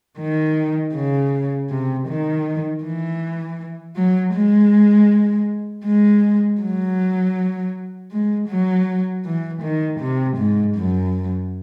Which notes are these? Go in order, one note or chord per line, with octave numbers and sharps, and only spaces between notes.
D#3
C#3
C3
D#3
E3
F#3
G#3
G#3
F#3
G#3
F#3
E3
D#3
C3
G#2
F#2